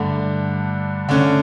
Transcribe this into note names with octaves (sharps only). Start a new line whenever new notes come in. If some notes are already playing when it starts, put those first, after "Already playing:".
Already playing: G2 D3 A3
D3 A3 C#4